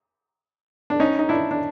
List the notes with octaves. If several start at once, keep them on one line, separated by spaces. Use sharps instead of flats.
D4
C#4 D#4
D#4
D4 E4
D4